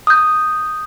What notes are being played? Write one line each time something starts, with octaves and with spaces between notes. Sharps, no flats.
D#6 G6